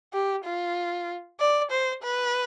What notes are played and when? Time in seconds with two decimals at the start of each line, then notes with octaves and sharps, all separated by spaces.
0.13 G4
0.45 F4
1.40 D5
1.71 C5
2.03 B4